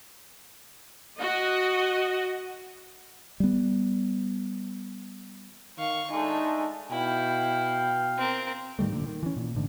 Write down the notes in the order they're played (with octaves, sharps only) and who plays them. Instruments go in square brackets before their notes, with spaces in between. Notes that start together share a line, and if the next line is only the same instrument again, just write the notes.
[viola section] F#4 D#5
[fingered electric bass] G3 B3
[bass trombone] D#3 [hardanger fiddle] F5 C#6
[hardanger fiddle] G#3 [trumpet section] A3 D4 A4 [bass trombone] D#4
[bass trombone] B2 [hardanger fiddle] E4 [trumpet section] F5 G5
[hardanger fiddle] C4 A#4
[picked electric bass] G#2 D#3 G3 A3
F#1 A#2 D3
D#3
E3 C#4
A#2
A1 G#2 D3